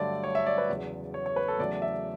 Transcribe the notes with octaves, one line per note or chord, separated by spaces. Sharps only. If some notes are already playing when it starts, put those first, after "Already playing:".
Already playing: G2 D3 F#3 A3 D5
C#5
E5
D5
B4
E2 C#3 F#3
C#5
C#5
B4
A4
E2 C#3 F#3 A3 D5
E5